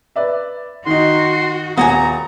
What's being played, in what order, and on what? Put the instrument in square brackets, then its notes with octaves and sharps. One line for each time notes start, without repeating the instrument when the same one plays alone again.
[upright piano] B4 D5 E5
[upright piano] D#3 D#4 [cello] F#4 [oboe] C6
[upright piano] D#1 [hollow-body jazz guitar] B3 F#5 G#5 [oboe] A#5